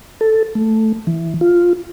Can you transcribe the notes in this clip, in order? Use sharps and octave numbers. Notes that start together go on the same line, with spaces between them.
A4
A3
E3
F4